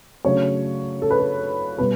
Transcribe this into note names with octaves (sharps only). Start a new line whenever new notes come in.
C#3 F#3 A3 D4 C#5
A4
B4
A4
B2 G3 B4